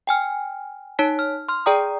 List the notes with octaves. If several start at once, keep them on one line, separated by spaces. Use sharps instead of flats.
G5 G#5 F6
D#4 C#5 A5 B6
F6
C6 F6
G#4 D5 G5 A#5 D#6